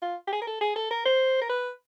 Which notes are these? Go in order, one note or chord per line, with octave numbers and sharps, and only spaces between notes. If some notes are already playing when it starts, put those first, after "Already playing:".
F4
G4
G#4
A#4
A4
G#4
A4
A#4
C5
A#4
B4